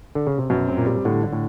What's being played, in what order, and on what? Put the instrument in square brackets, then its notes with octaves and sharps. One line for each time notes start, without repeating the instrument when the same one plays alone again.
[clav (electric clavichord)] D3
C#3
C3
[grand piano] F#2 [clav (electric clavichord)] B2
[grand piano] C4
[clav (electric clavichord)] A#2
[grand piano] G3
[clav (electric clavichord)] A2 [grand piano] D3
[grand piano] D3
[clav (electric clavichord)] A2